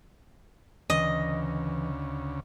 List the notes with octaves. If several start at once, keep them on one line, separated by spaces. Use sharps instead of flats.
D2 C#3 E3 D#5